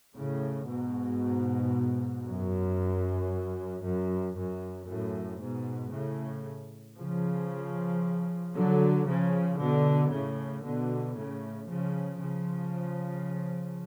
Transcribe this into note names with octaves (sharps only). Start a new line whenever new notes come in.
A2 C#3
G#2 B2
F#2
F#2
F#2
F#2 A2
G#2 B2
A2 C#3
C#3 F3
D3 F#3
C#3 F3
B2 D3
A2 C#3
B2 D3
A2 C#3
C#3 F3
C#3 F3